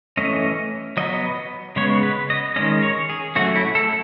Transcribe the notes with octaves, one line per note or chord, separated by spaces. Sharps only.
E3 A3 C#4 D#5
F#3 B3 D#5
C#3 G#3 B3 C#5
B4
D#5
D#3 G#3 C#4 D#5
C#5
G#4
F#3 A3 C#4 F#4
E4
A4